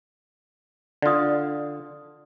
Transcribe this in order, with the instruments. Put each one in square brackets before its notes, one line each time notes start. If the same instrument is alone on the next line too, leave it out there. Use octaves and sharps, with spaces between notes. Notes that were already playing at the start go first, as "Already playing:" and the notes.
[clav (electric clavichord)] D3 F4 [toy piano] D5 D#6